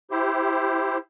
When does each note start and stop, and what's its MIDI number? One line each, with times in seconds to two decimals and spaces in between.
0.11 0.98 64
0.11 0.98 67
0.11 0.98 72